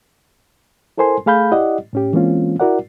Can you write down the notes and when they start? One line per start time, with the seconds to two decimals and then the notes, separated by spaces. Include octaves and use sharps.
0.98 E4 A4 A#4 C5 G#5 C6
1.26 A3 G#4 F5 B5 G6
1.51 E4 G4 D5 D#5 F#5
1.93 A2 C#4 G4
2.13 E3 G#3 A#3 C4 C#4 F4
2.60 E4 F#4 A#4 D5 F#5